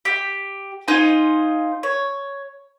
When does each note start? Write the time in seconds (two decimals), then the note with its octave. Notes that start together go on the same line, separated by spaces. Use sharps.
0.05 G4
0.88 D#4 F4 C5 G#5
1.83 C#5